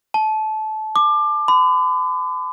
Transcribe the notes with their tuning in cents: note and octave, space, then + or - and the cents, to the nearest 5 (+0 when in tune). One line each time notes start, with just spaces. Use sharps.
A5 -25
D6 +25
B5 +45